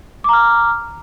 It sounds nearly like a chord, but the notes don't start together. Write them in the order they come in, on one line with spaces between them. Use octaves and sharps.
D6 A#5 F6